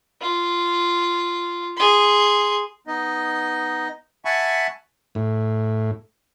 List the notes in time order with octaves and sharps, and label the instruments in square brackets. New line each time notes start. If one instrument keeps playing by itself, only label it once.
[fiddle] F4
G#4 C6
[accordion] B3 D#4 D#5
E5 F#5 G#5 A5 B5 C#6
[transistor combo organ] A2